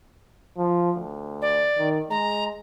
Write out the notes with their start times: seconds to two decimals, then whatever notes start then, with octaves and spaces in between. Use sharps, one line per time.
0.58 F3
0.97 D2
1.42 D5
1.78 D#3
2.10 G#3 A#5